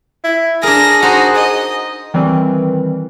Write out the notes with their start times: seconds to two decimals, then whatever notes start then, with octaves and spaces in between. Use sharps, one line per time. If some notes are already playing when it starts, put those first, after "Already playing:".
0.24 E4
0.63 D4 G#4 A#4 A#6
1.03 D#4 F#4 C5
1.35 D#5
2.14 D#3 E3 G3 C4